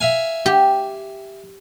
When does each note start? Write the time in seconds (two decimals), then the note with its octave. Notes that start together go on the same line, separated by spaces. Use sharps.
0.01 E5 F5 G#5
0.46 G4